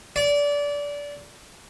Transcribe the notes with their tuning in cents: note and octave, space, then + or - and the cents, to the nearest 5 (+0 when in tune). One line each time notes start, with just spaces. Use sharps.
D5 -25